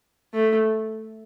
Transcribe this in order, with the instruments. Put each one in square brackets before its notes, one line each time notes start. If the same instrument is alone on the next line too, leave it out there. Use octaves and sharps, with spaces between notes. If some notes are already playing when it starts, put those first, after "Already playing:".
[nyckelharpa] A3